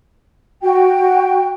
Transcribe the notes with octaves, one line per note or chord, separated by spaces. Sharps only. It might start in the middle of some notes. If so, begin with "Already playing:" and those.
F#4 G5